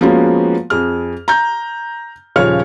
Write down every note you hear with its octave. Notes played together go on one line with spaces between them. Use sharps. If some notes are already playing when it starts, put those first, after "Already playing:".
F3 G#3 A#3 B3 C#4 F#4
F2 G#4 F6
A#5 G6
D#1 C#3 F3 C#5 F6